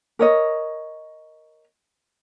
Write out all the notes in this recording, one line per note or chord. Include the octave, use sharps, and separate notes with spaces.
A#4 C#5 D#5